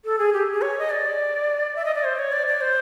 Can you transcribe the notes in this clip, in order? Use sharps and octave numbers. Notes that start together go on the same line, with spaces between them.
A4
G#4
G4
G#4
C#5
D#5
D5
E5
D#5
D5
C5
C#5
D5
D5
C5